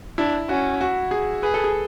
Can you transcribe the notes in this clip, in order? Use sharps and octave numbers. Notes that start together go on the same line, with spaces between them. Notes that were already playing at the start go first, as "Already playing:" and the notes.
D4 E4
C#4 F#4
F#4
G#4
G#4 B4
A4
G#4